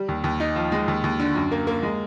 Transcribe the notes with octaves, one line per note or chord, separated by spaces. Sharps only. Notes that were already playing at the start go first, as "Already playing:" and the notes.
Already playing: G3
D#2
D#2
D#4
F3
G#3
D#2
D#2
D3
F#2
A#3
A#3
G#3